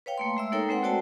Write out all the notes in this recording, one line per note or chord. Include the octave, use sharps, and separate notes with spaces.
B4 C#5 F5 G5
A3 A#3 C6
G#3 E5 E6
A#3 D#4 A4 A#4 C#5 G5
G#3 C4 B4 F#5
A3 F#4 C5 D5 G5 A5